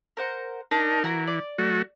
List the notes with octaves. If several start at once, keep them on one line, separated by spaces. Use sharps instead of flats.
A#4 C5 F#5
D4 D#4 A#4
E3 F#4 A#4 A#5
D5
F#3 A3 F#4